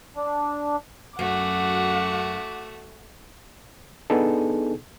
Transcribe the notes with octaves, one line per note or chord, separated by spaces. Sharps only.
D4
F#2 A3 F#4 F#5 D6
B3 D4 D#4 G#4 A4